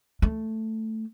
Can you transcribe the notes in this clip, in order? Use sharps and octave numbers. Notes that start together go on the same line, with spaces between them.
A3